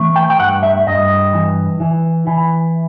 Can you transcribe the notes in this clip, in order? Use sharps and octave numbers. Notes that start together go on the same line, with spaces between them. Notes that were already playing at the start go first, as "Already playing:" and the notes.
Already playing: E3 A3
G5
G5
G2 F#5
E5
G2 D#5
E3
E3
E3